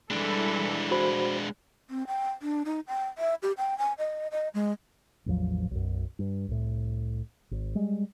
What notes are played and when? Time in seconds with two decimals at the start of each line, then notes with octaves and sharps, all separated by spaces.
0.11 E3 G3 G#3 D4 A4
0.91 F#4 C5 B5
1.90 C4
2.07 G5
2.42 D4
2.65 D#4
2.88 G5
3.18 E5
3.43 G4
3.58 G5
3.78 G#5
3.98 D#5
4.32 D#5
4.54 G#3
5.26 A1 E2 F3 F#3
5.71 B1 F#2
6.19 G2
6.48 C2 A2
7.51 G#1
7.75 G3 G#3